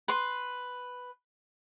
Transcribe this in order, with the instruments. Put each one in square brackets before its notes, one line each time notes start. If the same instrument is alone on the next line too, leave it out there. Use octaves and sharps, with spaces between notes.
[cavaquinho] B4 C6